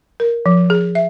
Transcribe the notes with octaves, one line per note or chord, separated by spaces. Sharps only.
A#4
F3
G#4
E5